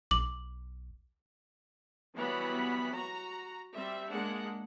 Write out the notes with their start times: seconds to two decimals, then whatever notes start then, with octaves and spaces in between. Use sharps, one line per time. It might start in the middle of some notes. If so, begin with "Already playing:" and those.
0.11 B1 D6 F#7
2.17 E3 F#3 G3 B3 F#5 B5
2.93 F#4 A#5
3.74 G3 C4 E5
4.11 G#3 A#3 D4 F#5